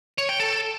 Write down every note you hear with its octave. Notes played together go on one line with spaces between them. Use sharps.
C#5
G5
A4